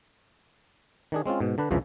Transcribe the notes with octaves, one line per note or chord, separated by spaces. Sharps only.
D#3 D4 G#4
G#3 C4 C#4 F4
G#2 B2
D3 D4 B4
C2 F2 C#3 E3 F3